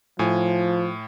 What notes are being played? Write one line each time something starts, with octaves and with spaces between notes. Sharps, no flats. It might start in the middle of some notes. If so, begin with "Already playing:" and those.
A2 F3 G#5